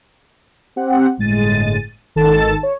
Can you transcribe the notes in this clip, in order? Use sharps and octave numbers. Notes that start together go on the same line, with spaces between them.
C4 G4 F#5
G1 A2 G#3 A6 D#7
G#1 D#3 A4 A5 A6 E7
C#5